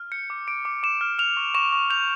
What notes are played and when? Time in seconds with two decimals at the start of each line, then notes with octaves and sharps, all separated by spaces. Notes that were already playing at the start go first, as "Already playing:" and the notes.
Already playing: F6
0.11 G6 C#7
0.30 D6
0.47 D6 D7
0.65 D6
0.83 D6 E7
1.01 F6
1.19 F6 F7
1.37 C#6
1.55 C#6 E7
1.72 C#6
1.90 G6 F7